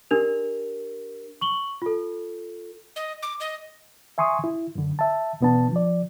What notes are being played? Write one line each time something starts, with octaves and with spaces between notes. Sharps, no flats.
D4 G4 A#4 F7
C#6 F#7 G7
F4 A4
D#5
D6
D#5
E5 G#5 C6 C#6 D#6
E4
F#2 D3
E5 A5
E2 B2 B3 D4 A5
F3 D5